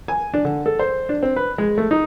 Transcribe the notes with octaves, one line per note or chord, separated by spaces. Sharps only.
G#5
D4
D3
A4
C5
D4
C4
B4
G#3
A3
D#4